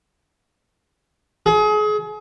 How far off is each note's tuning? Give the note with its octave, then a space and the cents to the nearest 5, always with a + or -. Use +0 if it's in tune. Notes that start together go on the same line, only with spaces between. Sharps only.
G#4 +30